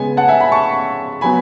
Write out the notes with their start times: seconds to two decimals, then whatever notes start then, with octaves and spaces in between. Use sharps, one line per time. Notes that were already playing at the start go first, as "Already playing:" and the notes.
Already playing: C#3 G#3 B3 G#5
0.17 F#5 A5
0.28 E5 G#5
0.40 G#5 B5
0.52 A5 C#6
1.21 F#3 B3 G#5 B5